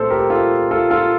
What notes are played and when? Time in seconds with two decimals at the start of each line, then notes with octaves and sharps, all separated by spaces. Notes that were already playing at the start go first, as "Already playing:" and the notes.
Already playing: C2 A#2 A3 A4 C5
0.10 G4 A#4
0.30 F4 A4
0.71 F4 A4
0.91 F4 A4